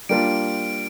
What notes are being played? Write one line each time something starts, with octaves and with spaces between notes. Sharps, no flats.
G3 A#3 D4 F4 D7